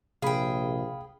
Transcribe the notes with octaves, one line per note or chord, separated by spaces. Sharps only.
A#1 C3 G#4 F5 G5 B5